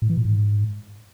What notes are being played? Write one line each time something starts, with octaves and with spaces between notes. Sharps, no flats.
A2
E3
A#2
G#2